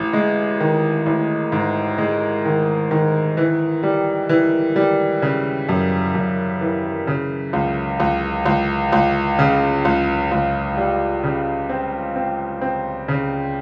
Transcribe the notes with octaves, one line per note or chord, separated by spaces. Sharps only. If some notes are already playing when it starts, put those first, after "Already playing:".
Already playing: A1
G#3
D#3
A1
G#2
G#3
D#3
D#3
E3
G3
E3
G3
C#3
F#2
F#2
E3
C#3
C#2
C#2
C#2
C#2
C#3
C#2
C#2
G3
C#3
C4
C4
C4
C#3